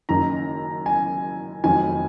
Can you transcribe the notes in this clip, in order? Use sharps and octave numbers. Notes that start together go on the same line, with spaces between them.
F#1 F#2 D#3 A#5
G#5
F1 F2 D#3 F#3 G#5